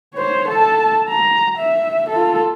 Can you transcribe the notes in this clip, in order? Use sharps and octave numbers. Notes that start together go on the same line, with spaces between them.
C5 C#5
A4 A5
A#5
E5
F4 A4